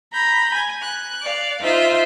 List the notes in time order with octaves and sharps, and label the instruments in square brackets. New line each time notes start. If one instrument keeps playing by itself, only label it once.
[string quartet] A#5 B5 G6
G#5
F#6
D5 F5
D#4 F4 C5 E5